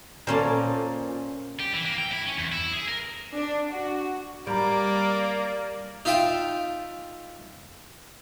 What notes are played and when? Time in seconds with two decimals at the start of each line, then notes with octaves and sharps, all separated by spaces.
0.27 A#2 A#3 C#4 C5 A5
1.60 G4
1.73 E3
1.84 A#3
1.98 G5
2.12 E4
2.26 C#4
2.38 E2
2.52 E4
2.73 G#4
2.88 A#4
3.34 D4
3.70 F#4
4.47 G3 A#3 D5 A#5 B5 D7
6.05 D#4 F4 E5 F5 G5 A5